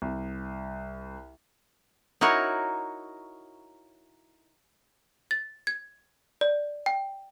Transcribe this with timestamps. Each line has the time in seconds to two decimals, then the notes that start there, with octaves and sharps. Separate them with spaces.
0.02 C2
2.21 D#4 E4 F#4 A#4 C#5
5.31 A6
5.67 G#6
6.41 D5
6.86 G5